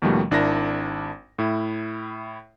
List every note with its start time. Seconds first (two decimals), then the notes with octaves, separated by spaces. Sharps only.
0.02 D#2 B2 D#3 F3 G3 A3
0.31 G#1 D4 E4 A#4 A#6
1.39 A2 E4